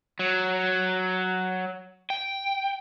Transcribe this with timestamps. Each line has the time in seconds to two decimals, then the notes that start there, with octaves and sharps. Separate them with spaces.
0.19 F#3
2.10 G5